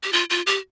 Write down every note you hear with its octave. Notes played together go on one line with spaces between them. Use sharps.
G4
F4
F4
G4